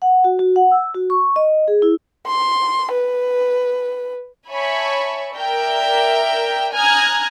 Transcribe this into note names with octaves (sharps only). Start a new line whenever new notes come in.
F#5
F#4
F#4
F#5
E6
F#4
C#6
D#5
G#4
E4
C6
B4
C#5 E5 G#5 A5 B5 C#6
A#4 D5 E5 G5
G#5 A#5 D#6 F6 F#6 G#6